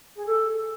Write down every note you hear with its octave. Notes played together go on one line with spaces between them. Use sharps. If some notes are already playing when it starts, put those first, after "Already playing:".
G#4
A4